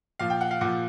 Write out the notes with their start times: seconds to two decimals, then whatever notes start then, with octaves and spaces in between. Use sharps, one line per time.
0.19 A#2 F3 F5
0.30 G5
0.41 F#5
0.51 F5
0.61 A#2 F3 F#5